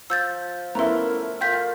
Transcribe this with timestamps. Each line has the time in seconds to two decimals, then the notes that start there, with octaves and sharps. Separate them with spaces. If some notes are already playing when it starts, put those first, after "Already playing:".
0.10 F3 E6 G6 A6
0.75 A3 B3 C#4 E4 A#4 A#5 C6
1.41 F4 A#4 G5 G6 B6